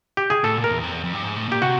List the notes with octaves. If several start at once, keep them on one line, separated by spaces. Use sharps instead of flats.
G4
G#4
A2 A4
A#2
A#4
E2
F2
E2
F2
G2
G#2
A2
A#2 G4
C3 F#4